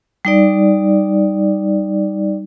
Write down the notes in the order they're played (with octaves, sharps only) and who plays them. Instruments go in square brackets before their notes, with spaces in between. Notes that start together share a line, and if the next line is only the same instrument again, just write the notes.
[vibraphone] G3 D#4 D5